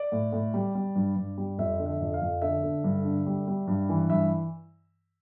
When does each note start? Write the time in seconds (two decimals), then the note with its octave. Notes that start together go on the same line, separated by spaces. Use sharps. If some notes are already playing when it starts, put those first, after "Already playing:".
Already playing: D5
0.12 A2
0.33 A2
0.54 G3
0.75 G3
0.95 G2
1.16 G2
1.38 G3
1.58 F2 E5
1.80 D3
1.86 E5
2.01 F2
2.14 F5
2.21 F2
2.42 D3 E5
2.63 D3
2.84 G2
3.05 D3
3.26 G3
3.48 G3
3.67 G2
3.89 E3
4.10 G2 E5